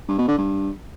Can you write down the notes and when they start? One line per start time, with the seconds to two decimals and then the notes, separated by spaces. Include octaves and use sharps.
0.08 G2
0.18 B2
0.28 D3
0.38 G2